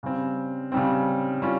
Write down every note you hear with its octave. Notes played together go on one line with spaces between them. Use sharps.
C#3 G3 C4
C#3 G3 C4
G3 C#4 F4